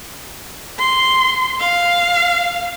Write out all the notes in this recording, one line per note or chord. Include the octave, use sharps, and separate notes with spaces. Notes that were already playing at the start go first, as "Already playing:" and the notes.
C6
F5